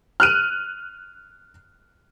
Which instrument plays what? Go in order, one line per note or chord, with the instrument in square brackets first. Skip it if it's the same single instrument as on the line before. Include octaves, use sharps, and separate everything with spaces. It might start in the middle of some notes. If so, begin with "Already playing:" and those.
[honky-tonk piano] F6 F#6 D#7